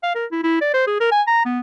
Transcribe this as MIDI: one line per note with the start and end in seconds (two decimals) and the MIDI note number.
0.03 0.15 77
0.15 0.25 70
0.31 0.38 64
0.43 0.57 64
0.61 0.73 74
0.74 0.82 72
0.87 0.96 68
1.00 1.07 70
1.11 1.22 80
1.27 1.41 82
1.45 1.60 59